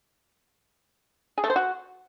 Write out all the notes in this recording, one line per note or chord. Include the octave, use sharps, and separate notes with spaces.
G#4
A3
C5
F#4